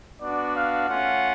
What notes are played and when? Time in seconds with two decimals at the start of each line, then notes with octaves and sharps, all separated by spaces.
0.21 B3 D4 F#4 D5
0.56 F5
0.89 A3 C#4 F4 F#5